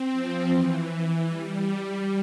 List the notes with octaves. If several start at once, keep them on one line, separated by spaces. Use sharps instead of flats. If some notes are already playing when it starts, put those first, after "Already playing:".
Already playing: C4
F3
E3
G3